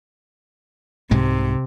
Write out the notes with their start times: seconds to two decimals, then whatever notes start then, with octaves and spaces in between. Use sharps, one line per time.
1.11 C2 G#2 C3 G#3